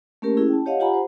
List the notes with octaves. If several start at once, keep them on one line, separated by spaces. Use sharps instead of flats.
A3 A#3 C#4 G4 A#4
C#4 E4 G#4
G5 A5
G4 C#5 D#5 F5 F#5
F4 G4 F#5 G#5 A#5 B5
C5